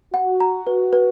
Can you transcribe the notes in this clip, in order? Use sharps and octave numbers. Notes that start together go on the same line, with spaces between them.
F#4 F#5
A#5
B4
B4